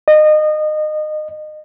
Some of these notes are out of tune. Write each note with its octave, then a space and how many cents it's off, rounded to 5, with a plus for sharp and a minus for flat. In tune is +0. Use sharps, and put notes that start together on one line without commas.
D#5 -25